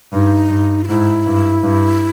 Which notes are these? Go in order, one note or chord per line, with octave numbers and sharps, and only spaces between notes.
G2 D#4
G2
F4
G#2 E4
G2
G2